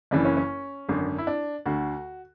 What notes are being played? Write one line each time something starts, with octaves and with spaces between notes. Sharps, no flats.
F#1 F#2 C#3 E3 D4
C#4
C#4
G#1 F#2 D3
E4
D4
D2 D3 F#4